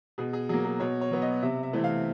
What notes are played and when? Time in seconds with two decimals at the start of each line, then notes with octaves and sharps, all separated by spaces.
0.18 B2 G#4
0.33 G#4
0.49 F#3 A#3 G#4
0.65 G#4
0.80 B2 C#5
1.01 C#5
1.11 F#3 B3
1.22 D#5
1.42 C3 E5
1.63 E5
1.73 E3 A3 C4
1.84 F5